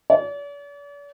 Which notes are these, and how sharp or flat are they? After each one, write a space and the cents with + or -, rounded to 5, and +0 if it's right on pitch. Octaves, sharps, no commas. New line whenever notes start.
D5 -45